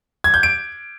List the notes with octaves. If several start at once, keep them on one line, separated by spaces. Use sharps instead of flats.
G#6
G6
D7